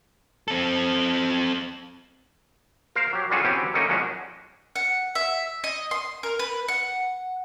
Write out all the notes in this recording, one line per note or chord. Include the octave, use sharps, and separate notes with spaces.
C4 A4
A#4 C5 F5
F#3 G4
G3 C#4 F4 F#4 G#4 A4
E3 F#3 C4 C#4 E4 G4
A3 A#3 C#4 D#4 A4 A#4
F3 F#3 G#3 C#4 D4 F#4
F#5
E5
D#5
C6
A#4
B4
F#5